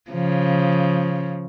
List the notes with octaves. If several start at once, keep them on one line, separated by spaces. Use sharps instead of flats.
C#3 F3